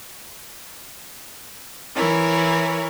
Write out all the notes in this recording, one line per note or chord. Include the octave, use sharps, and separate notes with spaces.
E3 E4 A#4 C#5